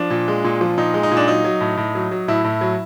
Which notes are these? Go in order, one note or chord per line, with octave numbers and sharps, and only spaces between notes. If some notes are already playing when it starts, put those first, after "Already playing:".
Already playing: F3 D4
A#2
G#3
A#2
F3
A#2 D#4
G#3
D#4
A#2
D4
F#3 D#4
F#3
A2
A2
F#3
F#3
A2 E4
A2
F#3